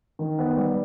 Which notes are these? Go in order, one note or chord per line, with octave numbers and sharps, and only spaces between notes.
D#3
B3
G3